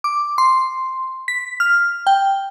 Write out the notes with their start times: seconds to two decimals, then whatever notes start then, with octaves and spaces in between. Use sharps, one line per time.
0.04 D6
0.38 C6
1.28 B6
1.60 F6
2.07 G5